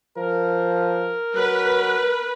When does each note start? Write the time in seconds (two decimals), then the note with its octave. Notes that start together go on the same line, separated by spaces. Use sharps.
0.18 F3 A#4
1.35 F#3 B4